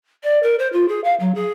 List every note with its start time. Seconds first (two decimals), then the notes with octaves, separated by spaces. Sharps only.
0.24 D5
0.43 A#4
0.59 C5
0.73 F4
0.89 G#4
1.04 F5
1.20 F#3
1.35 G#4